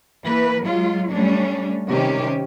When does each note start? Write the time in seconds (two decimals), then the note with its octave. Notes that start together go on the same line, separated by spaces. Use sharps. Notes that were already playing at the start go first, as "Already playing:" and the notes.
0.24 E3 A#3 B4
0.62 F#3 G#3 F4
1.10 G3 A3 C#4 D4
1.88 C3 D#3 G3 C#4 G4